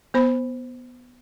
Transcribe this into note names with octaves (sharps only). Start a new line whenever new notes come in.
B3 C5 B5